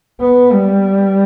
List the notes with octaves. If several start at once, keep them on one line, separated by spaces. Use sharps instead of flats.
B3
G3